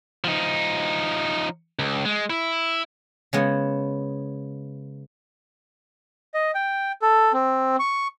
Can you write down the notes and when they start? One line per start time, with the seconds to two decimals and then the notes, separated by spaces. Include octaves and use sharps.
0.24 F3 D#4
1.79 C#2
2.05 G#3
2.30 E4
3.33 C#3 G#3 B3
6.34 D#5
6.55 G5
7.02 A4
7.33 C4
7.80 C#6